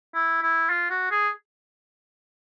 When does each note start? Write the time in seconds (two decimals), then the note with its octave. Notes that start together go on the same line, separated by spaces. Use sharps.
0.15 E4
0.42 E4
0.70 F4
0.90 F#4
1.11 G#4